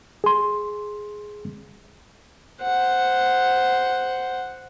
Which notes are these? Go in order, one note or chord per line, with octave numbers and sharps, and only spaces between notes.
G#4 C6
C5 F#5